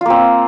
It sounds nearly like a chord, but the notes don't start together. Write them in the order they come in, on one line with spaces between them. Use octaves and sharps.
F4 A#3 C4